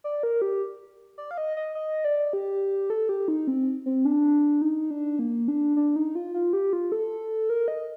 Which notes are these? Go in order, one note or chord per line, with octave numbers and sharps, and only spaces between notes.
D5
A#4
G4
D5
F5
D#5
D#5
D#5
D5
G4
A4
G4
D#4
C4
C4
D4
D#4
D4
A#3
D4
D4
D#4
F4
F4
G4
F4
A4
A#4
D#5